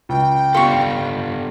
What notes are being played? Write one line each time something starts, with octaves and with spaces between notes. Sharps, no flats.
C#2 G5
B3 F4 G4 A4 C#6